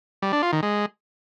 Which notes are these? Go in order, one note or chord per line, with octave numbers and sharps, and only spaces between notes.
G3
D4
F4
D#3
G#3